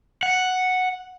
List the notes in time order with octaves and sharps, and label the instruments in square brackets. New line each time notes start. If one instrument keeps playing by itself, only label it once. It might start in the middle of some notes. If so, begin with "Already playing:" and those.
[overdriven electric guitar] F#5